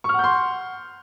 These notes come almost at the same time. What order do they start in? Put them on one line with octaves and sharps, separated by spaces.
C#6 F6 F#5 G6 C6